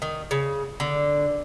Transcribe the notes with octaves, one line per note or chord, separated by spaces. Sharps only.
D#3
C#3
D3